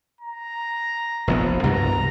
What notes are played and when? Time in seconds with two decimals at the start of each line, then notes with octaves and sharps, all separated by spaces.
0.21 A#5
1.27 F1 A#1 B3
1.64 C2 G2 B2 A#5